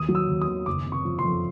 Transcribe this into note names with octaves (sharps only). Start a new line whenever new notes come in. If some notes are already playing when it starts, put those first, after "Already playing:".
Already playing: D#2 D#6
F#3
E6
D#2
D#6
D#3
F#1 D6
C3
C#6
F3
C6
F2